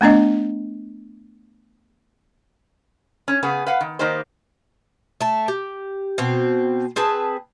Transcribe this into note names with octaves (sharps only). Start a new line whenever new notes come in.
A3 B3 D4 D#5
C#4
C#3 B3 G#4
B4 F5 F#5
D#3
D#3 A#3 D#4 G4 C5
A3 A5
G4
B2 C4
C4 G#4 B4 A5